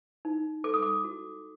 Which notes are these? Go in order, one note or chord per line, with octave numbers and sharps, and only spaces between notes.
D#4
A4 D6
D#6
D6
F#4